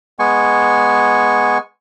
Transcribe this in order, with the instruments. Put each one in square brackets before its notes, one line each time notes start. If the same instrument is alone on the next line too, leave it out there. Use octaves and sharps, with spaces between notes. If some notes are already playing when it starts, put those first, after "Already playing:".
[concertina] G#3 B3 G#5 C#6